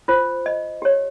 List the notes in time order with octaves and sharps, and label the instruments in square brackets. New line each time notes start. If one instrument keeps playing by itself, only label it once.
[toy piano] F4 C5
D#5
G4 C#5